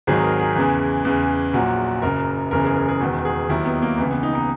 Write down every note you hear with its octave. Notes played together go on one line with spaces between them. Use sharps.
G#1 G#2 D#3 F#3 G#4
A#4
G#4
E2 C#3 E3
E2 C#3 E3
A#1 A#2 F#3 F#4
F#1 F#2 C#3 A#4
F#1 E2 C#3 E3 A#4
G#4
A#4
G#4
E1 E2 D#3 F#4
G#4
D#2 D#3 F#3 E4
B3
A#3
C#2 C#3 E3 B3
B3
D#4
D#4